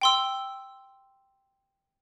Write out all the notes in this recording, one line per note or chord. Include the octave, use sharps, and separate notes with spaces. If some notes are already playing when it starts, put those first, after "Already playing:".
G5 C6 E6